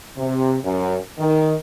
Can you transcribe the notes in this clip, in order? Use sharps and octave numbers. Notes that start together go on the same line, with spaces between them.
C3
F#2
D#3